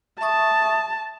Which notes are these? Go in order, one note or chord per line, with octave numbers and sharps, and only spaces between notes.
E5 A5 C#6 D#6